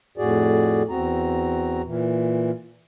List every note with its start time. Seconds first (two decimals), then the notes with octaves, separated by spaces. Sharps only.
0.18 F2 A2 F#4 G#4 D5
0.89 E2 C4 F#4 A#5
1.85 A#2 E3